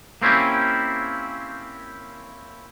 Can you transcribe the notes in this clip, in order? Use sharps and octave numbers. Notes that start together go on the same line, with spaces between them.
A#3 C4 C#4 E4 G4